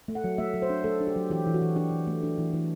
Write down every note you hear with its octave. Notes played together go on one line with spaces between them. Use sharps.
A3
F#5
F#3
A3 E5
F#3
C5
D4
A3 A4
D4
G4
F#3
E3 G4
E3
F#4
E3
D4 G4
E3
A3
D4
E3
E3